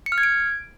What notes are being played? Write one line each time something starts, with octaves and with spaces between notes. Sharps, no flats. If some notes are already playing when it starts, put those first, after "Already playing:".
C#7
F6
G#6
D7